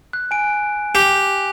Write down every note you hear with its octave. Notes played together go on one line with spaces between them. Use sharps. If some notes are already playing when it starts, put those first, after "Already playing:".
F#6
G#5 D7
G4